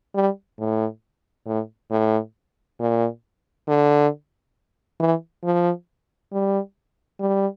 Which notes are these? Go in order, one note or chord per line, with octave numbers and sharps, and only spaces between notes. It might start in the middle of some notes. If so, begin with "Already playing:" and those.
G3
A2
A2
A2
A#2
D3
E3
F3
G3
G3